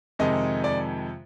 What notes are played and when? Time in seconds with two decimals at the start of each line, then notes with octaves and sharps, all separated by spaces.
0.19 F2 C3 D#3 G#3 D#5
0.64 D5